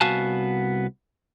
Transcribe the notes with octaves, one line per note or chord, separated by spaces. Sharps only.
C2 B3 F#4 F5 G#5 A5